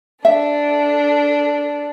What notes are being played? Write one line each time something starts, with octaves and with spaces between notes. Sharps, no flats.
D4 A4 E5